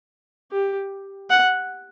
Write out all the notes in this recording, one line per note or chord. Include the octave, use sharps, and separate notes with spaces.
G4
F#5